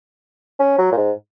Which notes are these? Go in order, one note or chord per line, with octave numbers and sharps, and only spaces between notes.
C#4
F#3
A#2
G#2